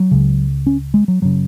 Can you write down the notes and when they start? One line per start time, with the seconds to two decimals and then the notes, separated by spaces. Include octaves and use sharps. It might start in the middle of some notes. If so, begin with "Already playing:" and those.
Already playing: F#3
0.11 C#2 C#3
0.67 C#4
0.94 G#3
1.08 F#3
1.22 F#1 C#3 F#3